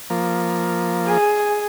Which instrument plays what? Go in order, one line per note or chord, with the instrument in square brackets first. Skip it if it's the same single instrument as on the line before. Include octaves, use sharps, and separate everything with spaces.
[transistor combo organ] F3 A#3
[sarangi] G#4